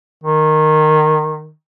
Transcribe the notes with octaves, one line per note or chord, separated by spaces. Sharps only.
D#3